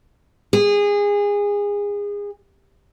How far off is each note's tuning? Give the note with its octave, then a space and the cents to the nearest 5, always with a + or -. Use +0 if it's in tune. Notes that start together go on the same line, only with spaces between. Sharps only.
G#4 -25